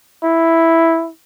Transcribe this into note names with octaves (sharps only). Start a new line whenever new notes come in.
E4